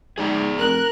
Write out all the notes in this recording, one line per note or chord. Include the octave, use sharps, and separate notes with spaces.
G#2 G#4 D5 A#5
F1 A#4 F#6